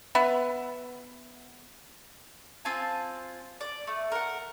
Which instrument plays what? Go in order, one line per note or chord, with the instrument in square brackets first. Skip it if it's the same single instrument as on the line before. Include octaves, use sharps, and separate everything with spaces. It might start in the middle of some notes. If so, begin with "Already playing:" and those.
[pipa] B3 B4 E5
[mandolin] C4 F4 G#5 A5
D5
A3
A#4 F#5